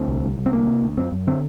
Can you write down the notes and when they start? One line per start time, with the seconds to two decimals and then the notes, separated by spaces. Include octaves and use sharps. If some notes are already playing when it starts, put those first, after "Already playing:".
Already playing: D2 C4
0.08 C2
0.23 C2
0.38 C2
0.46 C4
0.52 D2 A#3
0.67 C3
0.82 D2
0.97 F#2 C4
1.12 F#2
1.27 D3 C4